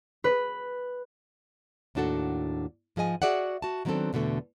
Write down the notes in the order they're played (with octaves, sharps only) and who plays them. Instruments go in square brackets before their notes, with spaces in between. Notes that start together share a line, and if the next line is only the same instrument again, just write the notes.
[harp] B4
[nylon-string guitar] D#2 A2 D4 F#4 A4 F#5
G#2 F3 G#4 D#5 G#5
F#4 G#4 D5 E5 F#5
F#4 A5
D#3 F#3 B3 C4 D4 A4
E2 B2 D3 A3